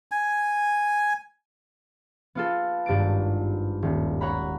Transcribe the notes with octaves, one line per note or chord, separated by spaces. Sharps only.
G#5
B3 F4 A4
G#1 G2 A6 D7
D#1
C#5 F#5 A#5 B5